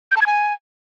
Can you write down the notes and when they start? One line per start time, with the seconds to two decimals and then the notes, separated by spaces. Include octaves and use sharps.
0.11 G6
0.16 A5
0.21 G#6
0.26 G#5